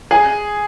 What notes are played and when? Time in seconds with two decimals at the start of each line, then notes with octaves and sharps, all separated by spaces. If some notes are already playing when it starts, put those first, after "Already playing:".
0.11 G#4